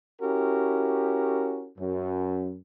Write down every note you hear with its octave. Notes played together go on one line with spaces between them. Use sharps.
C#4 E4 F#4 G4 A#4
F#2